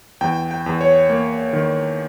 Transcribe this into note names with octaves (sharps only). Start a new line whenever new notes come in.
E2 G5
G5
E2
C#5
A#3
D#3